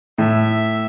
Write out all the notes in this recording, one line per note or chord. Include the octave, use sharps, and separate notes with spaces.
A2 E5